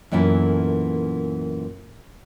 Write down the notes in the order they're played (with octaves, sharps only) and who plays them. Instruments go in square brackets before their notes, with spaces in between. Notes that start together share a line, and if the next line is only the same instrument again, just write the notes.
[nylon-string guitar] F#2 A#2 E3 B3 A4